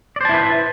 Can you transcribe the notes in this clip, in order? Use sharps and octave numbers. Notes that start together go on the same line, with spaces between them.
E4 B4 C5 D5 A5